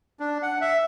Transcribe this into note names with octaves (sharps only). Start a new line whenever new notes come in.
D4
F#5
E5